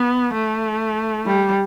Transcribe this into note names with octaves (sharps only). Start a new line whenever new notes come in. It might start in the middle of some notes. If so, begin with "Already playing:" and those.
Already playing: B3
A3
G3